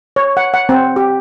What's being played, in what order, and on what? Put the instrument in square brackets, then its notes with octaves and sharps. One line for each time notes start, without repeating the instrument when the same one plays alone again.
[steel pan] C#5
F#5
F#5
C4
G4